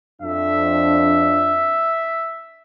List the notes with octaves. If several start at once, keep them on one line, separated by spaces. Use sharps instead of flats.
F2 D4 E5